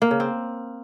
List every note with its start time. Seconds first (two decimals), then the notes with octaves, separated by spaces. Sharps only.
0.02 A#3
0.11 C#3
0.20 C4